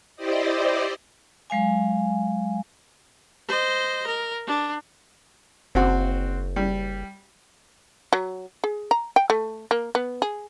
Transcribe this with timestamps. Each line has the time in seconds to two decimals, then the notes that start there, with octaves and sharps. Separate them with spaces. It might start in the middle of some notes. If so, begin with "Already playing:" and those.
0.16 E4 G4 C5 D5 D#5
1.50 F#3 G#3 F5 G#5
3.48 C5 D#5
4.07 A#4
4.47 D4
5.75 F#1 C4 F#4
6.56 G3
8.13 F#3
8.64 G#4
8.91 A#5
9.16 G5
9.30 A3
9.71 A#3
9.95 B3
10.22 G#4